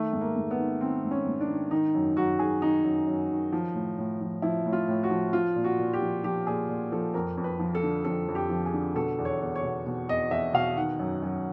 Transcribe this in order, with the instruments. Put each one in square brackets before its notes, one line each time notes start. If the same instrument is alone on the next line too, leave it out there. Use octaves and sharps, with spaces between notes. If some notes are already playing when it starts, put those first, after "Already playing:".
Already playing: [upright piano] D#3 A3
G#2
A#3
G#2
B3
D#3
D#3 C4
G#2
C#4
G#2
D4
D#3
D#3 D#4
F#2
F#2 F#4
D#3 G#4
D#3 D#4
F#2
F#2
D#3
F3
A2
A2
F3
F3 E4
A2
F4
A2
F#4
F3
F3 F4
A#2
F#4
A#2
G4
F3
F3 G4
A#2 G#4
A#2
F3 A4
F2 A#4
F2
B4
F3
A4
D3
F2 A4
F2
G4
F3
G#4
D3
B2 A4
E2
C#5
E2
C#5
B2
B2
E2 D#5
E2 E5
B2 F5
D#3 F#5
F#2
F#2